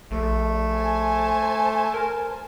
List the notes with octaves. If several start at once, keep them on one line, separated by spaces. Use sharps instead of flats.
A#1 A3
C5 G#5 A5
A#4